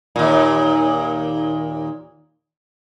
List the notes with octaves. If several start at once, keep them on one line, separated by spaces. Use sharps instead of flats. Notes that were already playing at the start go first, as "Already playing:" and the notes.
D#2 A#2